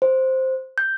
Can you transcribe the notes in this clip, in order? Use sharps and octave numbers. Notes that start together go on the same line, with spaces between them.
C5
G6